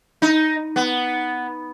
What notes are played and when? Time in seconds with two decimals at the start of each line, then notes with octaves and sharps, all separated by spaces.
0.22 D#4
0.76 B3